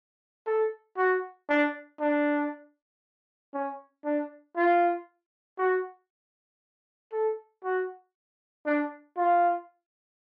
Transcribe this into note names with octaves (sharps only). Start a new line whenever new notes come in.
A4
F#4
D4
D4
C#4
D4
F4
F#4
A4
F#4
D4
F4